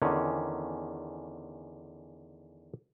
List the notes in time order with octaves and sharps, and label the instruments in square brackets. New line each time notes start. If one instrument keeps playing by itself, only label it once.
[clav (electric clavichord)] E2 D3 D#3 C#4